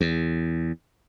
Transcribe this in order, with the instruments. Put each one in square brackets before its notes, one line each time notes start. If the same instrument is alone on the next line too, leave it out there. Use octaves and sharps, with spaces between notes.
[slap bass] E2